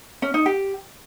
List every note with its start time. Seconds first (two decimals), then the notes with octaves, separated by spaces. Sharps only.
0.22 C#4
0.34 D#4
0.46 G4